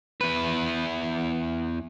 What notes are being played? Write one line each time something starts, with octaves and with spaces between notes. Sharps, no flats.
E2 B4